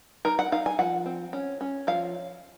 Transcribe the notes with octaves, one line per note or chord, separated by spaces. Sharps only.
D#4 A#4
F#5
D#4 F5
G#5
F3 F#5
C4
C#4
C#4
F3 F5